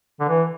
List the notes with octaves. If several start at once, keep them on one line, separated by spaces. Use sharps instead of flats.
D3
E3